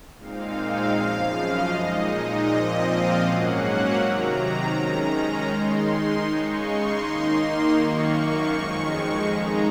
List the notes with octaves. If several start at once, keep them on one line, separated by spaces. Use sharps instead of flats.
A#2 G#3 C4 D#4 F5
F#2 C#3 F3 F5
D#5
A#2 G#3 D#4
A#2 F3 C4 D#5
F5
G#2 F#3 A#3 C#4 F#5
C3 D#3 F#3 A#5
D#3 G#3 C#4 A#5
D#3 G#3 D#4 C6
C#3 G#3 D#4 C#6
C6
D#3 A#3 D#4 C6
F#2 D#3 A#3 C#6
F2 D#3 G#3
C#3 G#3 D#4 A#5